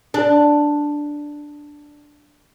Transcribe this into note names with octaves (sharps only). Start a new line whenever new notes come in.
D4